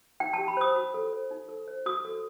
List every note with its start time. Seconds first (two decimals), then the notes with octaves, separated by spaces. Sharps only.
0.20 D#4 G5
0.33 A5
0.38 G4
0.48 B5
0.57 C5 D#6
0.75 F#4
0.94 A4
1.13 C5
1.31 D#4
1.49 A4
1.68 C5
1.86 F#4 D#6
2.05 A4